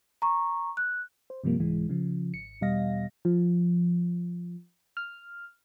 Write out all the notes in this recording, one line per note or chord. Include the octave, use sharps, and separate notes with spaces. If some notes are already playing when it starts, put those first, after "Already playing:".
A#5 C#6
F#6
C5
G2 C3 F3 G3 A#3
C2 G#2 E3 G#3
C#3 F3
G#1 C#7
E2 B2 G3 D#5 F5 A#6
F3
F6